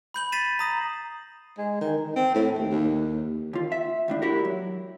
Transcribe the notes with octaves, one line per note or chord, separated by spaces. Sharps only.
B5 G6 F#7
A6 B6 C7 D#7 E7
A#5 D#6 A#6
G#3
D#3
D#3
C4
A2
D#2
D#2
D#2 F4
E5
D#2 A2 D4
E4 F#4 G4 A#4
F#3